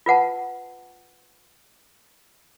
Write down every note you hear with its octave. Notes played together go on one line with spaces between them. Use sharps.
F4 B4 F#5 A5